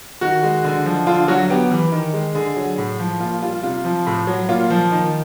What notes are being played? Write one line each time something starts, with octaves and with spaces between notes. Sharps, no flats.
D#3 F#4
G#3
D3
F3
D3 F4
F#3 F#4
B3 G4
E3
D#3
G#3
D3 G#4
F#3
A2
F3
A#2 F4
G3 F4
C3 F4
F3
A2
F#3
A#2 F4
F3
D#3